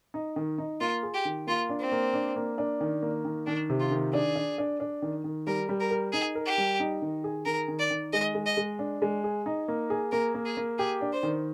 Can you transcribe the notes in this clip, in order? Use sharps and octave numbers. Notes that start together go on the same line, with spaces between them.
D#4
D#3
D#4
A#3 F4
G#4
G4
D#3
A#3 F4
D4
C4
A#3
D4
A#3
D4
D#3
A#3
D#3
D#3 D4
C3
F4
D#3
D4 G#4
D4
D4
D4
D#3
D#3
G3 A#4
G3
A#4
A#4
D#4 G#4
A#4
G4
G3
D#4
D#3
G#4
D#3 A#4
D#3
D5
D#3
G#3 D#5
G#3
D#5
G#3
D4
G#3
G#4
D#4
A#3
G#4
A#3 A#4
A#3
G#4
A#3
G4 G#4
D4
C5
D#3